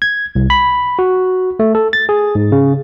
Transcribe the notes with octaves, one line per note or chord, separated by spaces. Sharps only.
G#6
C2
B5
F#4
A3
A4
A6
G#4
G#2
C#3